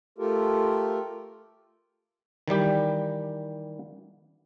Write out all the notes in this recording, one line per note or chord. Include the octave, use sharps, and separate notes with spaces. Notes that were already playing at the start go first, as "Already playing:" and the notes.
A3 F4 G4 A4 A#4
D#3 E3 G3 G4